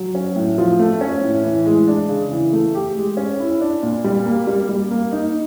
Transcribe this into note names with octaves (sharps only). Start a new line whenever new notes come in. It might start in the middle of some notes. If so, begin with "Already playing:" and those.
Already playing: F#3
C#4
A2
F3
A3
C#4
A2
E3
G#3
D4
C#3
E3
A3
G4
G#3
C#4
E4
D4
A#2
G3
A#3
G3
G3
A#3
D#4